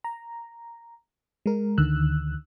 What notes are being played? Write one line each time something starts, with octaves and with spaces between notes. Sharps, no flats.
A#5
G#3 A#4
D2 D3 D#3 E6 F#6